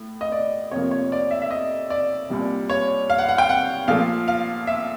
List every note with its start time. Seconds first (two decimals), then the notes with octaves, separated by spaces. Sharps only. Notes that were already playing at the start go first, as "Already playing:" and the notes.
Already playing: A2
0.21 D#5
0.32 D5
0.71 F2 C3 F3 A#3 C#5
0.91 C#5
1.12 D5
1.31 E5
1.42 E5
1.51 D#5
1.90 D5
2.30 C2 A#2 G3
2.70 C#5
3.10 F5
3.18 F#5
3.29 F#5
3.38 G5
3.49 F#5
3.88 A#2 F3 A3 F5
4.28 F5
4.67 E5